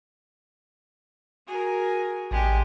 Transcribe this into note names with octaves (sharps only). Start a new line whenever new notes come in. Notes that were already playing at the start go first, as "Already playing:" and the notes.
F#4 G#4 A#4
A1 D3 G#3 G4